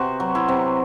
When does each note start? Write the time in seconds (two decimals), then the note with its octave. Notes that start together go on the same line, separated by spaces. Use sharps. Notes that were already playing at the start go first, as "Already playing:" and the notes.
Already playing: C3 B3 F#4 C5
0.20 F#3
0.35 E4
0.48 C3